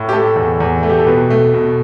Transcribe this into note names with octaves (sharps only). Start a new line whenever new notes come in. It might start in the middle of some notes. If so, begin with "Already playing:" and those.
Already playing: A2
G4
A3 A4
E2
E2
A3
G4
A4
B2 B4
A3
B2